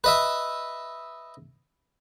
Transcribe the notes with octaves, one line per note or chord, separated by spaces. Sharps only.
B4 D#5 E5